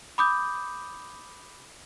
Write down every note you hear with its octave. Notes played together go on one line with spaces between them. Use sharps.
B5 D6 D#6 G6